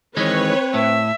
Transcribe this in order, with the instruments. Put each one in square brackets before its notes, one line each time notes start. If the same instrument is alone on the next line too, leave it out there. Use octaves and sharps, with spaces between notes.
[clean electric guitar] D#3 E3 G#3 [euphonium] C4 [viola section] B4 C#5
[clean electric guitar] A2 [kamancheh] E5